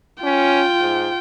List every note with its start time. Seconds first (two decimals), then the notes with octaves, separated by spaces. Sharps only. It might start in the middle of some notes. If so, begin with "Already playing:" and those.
0.24 C#4 F4 G5
0.80 G#2